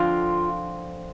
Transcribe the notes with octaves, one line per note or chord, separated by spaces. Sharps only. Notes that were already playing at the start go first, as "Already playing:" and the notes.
Already playing: D3 F3 C4 F4